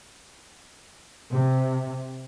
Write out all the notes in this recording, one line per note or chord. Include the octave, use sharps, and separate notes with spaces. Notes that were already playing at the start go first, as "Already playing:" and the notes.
C3